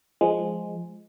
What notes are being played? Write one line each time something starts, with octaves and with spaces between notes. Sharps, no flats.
F3 G#3